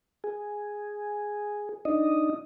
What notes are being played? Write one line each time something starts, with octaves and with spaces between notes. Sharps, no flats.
G#4
D4 D#4 D#5